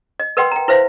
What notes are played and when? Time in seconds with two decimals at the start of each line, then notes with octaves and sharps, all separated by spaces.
0.20 D#5
0.37 A#4 B4 D#5 F#5 G5 C6
0.52 G5 A#5
0.68 E4 B4 C5 E5 F5